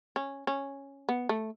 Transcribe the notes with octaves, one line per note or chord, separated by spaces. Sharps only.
C#4
C#4
B3
A3